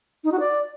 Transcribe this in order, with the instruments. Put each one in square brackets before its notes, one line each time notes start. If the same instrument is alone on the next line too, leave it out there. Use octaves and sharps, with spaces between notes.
[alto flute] D#4
F#4
D5